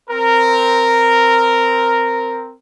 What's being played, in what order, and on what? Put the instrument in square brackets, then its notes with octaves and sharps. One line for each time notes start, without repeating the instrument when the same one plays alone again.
[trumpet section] C4 A#4